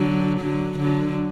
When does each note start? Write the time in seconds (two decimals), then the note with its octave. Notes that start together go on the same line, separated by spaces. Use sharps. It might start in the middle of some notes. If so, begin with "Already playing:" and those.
Already playing: D3 F#3
0.40 D3 F#3
0.79 D3 F#3